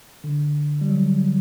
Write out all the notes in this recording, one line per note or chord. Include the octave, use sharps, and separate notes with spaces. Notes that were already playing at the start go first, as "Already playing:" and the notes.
D3
G3
F#3